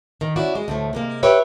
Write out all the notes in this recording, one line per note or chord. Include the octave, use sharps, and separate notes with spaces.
D#3
C#4 E4 F#4 D5
G#3 D#5
D2 A2 A3
C3 G#3 A#3
G4 B4 C#5 E5